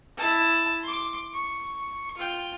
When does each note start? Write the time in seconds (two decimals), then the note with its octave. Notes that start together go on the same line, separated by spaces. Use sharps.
0.17 E4 A5
0.83 C6 D6
1.33 C#6
2.17 F4 G5